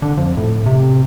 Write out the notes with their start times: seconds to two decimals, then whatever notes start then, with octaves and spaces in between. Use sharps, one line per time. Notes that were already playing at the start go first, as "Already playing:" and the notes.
0.02 D3
0.17 F2
0.37 A2
0.66 C3